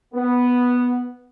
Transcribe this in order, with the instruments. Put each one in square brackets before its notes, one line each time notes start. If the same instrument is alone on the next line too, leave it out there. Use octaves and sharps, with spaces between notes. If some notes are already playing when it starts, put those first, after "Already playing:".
[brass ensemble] B3